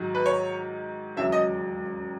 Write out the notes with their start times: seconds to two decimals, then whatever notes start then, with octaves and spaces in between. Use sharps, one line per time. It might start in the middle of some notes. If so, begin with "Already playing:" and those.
Already playing: G#2 D#3 F#3 F#4
0.15 B4
0.26 C#5
1.16 E1 D#2 C#3 F#3 C#4 E5
1.32 D#5